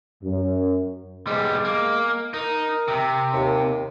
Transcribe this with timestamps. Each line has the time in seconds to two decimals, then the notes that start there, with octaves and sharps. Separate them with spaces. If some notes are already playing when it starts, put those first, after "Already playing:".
0.24 F#2
1.27 B1 G3 G#3
1.65 A#3
2.33 D#4 A#4
2.88 C3
3.33 D#2